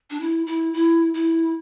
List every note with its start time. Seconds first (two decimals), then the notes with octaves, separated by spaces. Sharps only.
0.10 D4
0.20 E4
0.46 E4
0.73 E4
1.14 E4